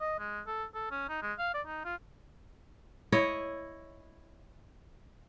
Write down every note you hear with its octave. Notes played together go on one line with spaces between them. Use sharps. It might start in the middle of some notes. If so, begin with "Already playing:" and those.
D#5
G#3
A4
A4
C#4
D#4
G#3
F5
D5
D#4
F4
E4 C#5 D#5